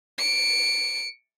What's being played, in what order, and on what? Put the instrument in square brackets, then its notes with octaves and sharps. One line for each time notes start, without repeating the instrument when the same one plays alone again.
[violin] C#7 D7